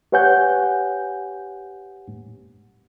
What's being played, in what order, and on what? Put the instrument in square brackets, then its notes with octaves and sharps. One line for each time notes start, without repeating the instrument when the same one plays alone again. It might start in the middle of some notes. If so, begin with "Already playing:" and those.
[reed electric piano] G4 B4 C#5 F#5 G#5 G6